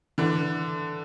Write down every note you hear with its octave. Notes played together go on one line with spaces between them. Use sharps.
D3 E3